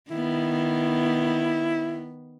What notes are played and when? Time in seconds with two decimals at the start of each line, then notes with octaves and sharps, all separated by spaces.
0.11 D#3 B3 E4